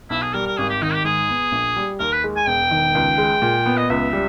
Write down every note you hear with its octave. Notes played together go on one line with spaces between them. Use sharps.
B1 E4
G#4
G3 A#4
A#4
G#1 G#4
G4
D#3 D#4
G4
G#2 G#4
B3
A#1
G3
D#2 A#4
B4
G#3
G#5
E1 G5
D#3
C#2
G#3
A#2
B3
D#5
C#2 E5
G3